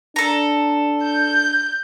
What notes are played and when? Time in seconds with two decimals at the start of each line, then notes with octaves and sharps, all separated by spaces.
0.16 D4 A4 A#5
1.03 G6